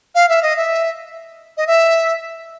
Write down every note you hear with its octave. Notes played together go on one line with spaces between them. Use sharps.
F5
E5
D#5
E5
D#5
E5